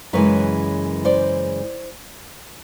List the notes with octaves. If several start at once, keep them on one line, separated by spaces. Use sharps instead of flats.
F#2 C#3 E3 G#3 B4 C#5
C5 D5